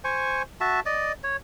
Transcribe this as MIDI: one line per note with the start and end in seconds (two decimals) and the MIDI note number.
0.04 0.42 72
0.04 0.42 80
0.04 0.42 85
0.61 0.80 66
0.61 0.80 76
0.61 0.80 81
0.86 1.12 74
0.86 1.12 75
1.24 1.36 73